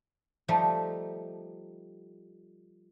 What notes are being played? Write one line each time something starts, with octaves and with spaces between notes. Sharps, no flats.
F3 G3 A3 D#4